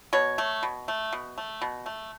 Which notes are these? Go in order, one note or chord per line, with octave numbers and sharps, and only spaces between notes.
B2 C#5
A3
B2
A3
B2
A3
B2
A3